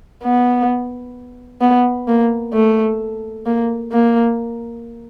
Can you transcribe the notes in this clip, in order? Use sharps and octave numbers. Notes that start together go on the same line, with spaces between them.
B3
B3
A#3
A3
A#3
A#3